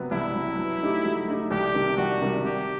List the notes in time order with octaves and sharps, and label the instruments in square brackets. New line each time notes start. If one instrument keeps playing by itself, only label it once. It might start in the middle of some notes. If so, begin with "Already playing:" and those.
Already playing: [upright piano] C3 F#3 B3
[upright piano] C2 [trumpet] E4
[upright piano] C3 F#3 B3
F#3
A3 D#4 G4
F#3
A3 D#4 G4
[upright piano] C2 [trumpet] G4
[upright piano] C3 D#3 G3
[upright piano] C2 [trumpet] F#4
[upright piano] C3 D#3 G3
[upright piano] C3 [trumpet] G4